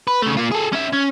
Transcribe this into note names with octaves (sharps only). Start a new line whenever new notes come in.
B4
C#3 A3
A#3 F4
G#4 A4
C#4 E5
C#4